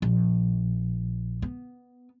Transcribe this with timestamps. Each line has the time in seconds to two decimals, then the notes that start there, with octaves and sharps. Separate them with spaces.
0.02 A#1
1.42 B3